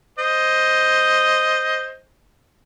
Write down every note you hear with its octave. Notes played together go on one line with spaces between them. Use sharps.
C5 D#5